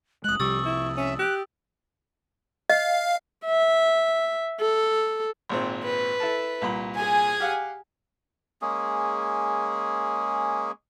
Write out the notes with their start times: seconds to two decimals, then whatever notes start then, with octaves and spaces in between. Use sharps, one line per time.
0.24 F1 G#3 D#6 F#6 F#7
0.40 C2 C3 F3 G3 C#6 D#6 E6 A6
0.65 E4
0.97 C#4 E5
1.19 G4 F#6
2.70 D#5 F5
3.46 E5
4.60 A4
5.49 G#1 A#2 C4
5.84 B4
6.20 E4 A4 A5
6.62 C2 A#2 B5
6.95 G#4 G#5
7.40 G4 F5 F#5
8.62 G#3 A#3 C#4 G#4